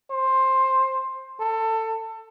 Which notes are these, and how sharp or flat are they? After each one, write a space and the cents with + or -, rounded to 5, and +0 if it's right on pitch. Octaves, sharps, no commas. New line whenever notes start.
C5 +10
A4 +20